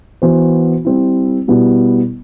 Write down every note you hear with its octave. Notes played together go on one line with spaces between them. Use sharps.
E3 B3 F#4 C5
G3 C4 E4
B2 G3 B3 E4